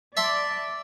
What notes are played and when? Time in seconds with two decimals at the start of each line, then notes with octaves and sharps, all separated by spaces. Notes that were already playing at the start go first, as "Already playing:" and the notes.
0.17 D5 E5 A5 C6